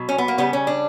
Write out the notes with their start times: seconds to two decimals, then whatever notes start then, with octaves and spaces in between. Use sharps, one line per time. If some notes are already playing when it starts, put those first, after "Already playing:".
Already playing: B2 F#3
0.09 C#4
0.18 B3
0.28 A#3
0.38 C#3 G3 B3
0.53 C#4
0.67 D4